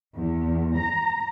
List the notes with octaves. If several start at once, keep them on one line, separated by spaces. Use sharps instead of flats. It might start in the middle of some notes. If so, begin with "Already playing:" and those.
E2
A#5